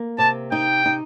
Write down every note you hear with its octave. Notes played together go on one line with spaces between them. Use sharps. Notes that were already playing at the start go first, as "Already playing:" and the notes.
Already playing: A#3
C3 A5
D#4 G5
D#4